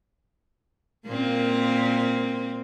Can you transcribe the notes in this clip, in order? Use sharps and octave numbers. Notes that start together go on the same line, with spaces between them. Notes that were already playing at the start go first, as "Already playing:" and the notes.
A#2 A#3 C4